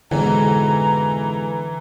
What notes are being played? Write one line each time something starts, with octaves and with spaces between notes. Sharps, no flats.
F2 G#2 B2 D3 E3 A#5